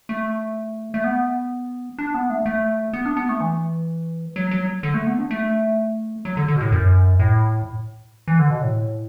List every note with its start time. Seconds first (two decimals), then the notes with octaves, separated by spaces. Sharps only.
0.09 A3
0.94 A3
1.04 B3
1.98 D4
2.14 B3
2.30 A3
2.46 A3
2.93 B3
3.05 D4
3.17 B3
3.29 A3
3.40 E3
4.36 F#3
4.51 F#3
4.83 D3
4.94 A3
5.07 B3
5.19 D4
5.31 A3
6.25 F#3
6.37 D3
6.48 D3
6.56 B2
6.61 A2
6.72 F#2
7.20 A2
8.28 E3
8.39 D3
8.51 B2
8.62 A2